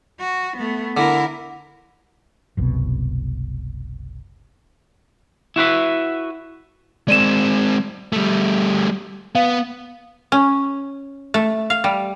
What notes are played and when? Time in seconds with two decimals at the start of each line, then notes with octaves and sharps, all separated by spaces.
0.20 F#4
0.57 A3 B3
0.97 D3 E4 A#4
2.57 F#1 C2 B2
5.56 E4 F#4 B4 E5
7.08 G#3 C4 D5 D#7 E7
8.13 G3 A3
9.35 B3 F5
10.32 C#4
11.34 A3
11.70 F5
11.84 G3